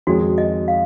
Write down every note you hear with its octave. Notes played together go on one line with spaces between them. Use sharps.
F2 D#3 G#3 C#4 F#4 G#4
D#5
F5